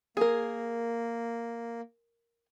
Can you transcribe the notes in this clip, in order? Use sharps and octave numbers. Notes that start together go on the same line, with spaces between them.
A#3 G#4 A#4